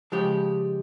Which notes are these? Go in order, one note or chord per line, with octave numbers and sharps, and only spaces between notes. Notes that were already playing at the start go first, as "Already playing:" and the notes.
C#3 F3 G#3 G4